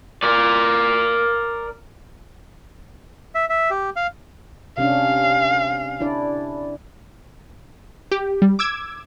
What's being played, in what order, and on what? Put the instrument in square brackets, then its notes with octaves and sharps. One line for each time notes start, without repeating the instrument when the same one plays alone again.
[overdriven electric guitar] A#4 D5
[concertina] E5
E5
G4
F5
[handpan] C3 C#4 D4 [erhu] F5
[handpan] D4 E4 D5
[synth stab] G4
G3
D6 E6 G#6